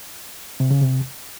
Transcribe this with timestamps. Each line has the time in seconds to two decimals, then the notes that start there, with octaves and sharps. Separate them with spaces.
0.60 C3
0.71 C#3
0.81 C3